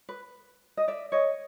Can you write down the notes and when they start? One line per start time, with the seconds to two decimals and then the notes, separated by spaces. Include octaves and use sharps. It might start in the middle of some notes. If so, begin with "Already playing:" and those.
0.09 B4
0.77 D#5
0.88 D5 E5
1.12 C#5 D#5